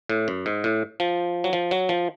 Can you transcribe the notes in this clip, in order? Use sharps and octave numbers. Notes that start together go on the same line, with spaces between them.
A2
F#2
G#2
A2
F3
F#3
F3
F#3
F3